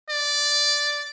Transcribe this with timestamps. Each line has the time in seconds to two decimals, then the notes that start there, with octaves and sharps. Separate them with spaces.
0.09 D5